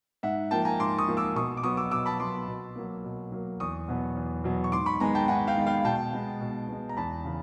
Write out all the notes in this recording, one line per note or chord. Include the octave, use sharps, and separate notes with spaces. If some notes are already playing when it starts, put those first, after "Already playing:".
G#2 E5 F#5
F3 A#3 G5 A5
G#5 A#5
G#2 C6 D6
C#6 D#6
F3 A#3
D6 E6
B2 C#6 D#6
D6
F#3 B3 C#6 D#6
D6 E6
B2 D6 E6
A5 B5
F#3 B3 C6 D6
B2
F#3 A#3
B2
F#3 A#3
E2 C#6 D#6
B2 F#3 B3
E2
B2 F#3 B3
C#6
G#2 C6 D6
B5 C#6
D#3 G#3 B3 G#5 A#5
G5 A5
G#2 F#5 G#5
F5 G5
D#3 G#3 B3
F5 G5
B2 G5 A5
G#3 B3
B2
G#3 B3
A#5
E2 A5 B5
C#3 E3